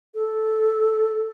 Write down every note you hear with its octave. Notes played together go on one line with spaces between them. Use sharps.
A4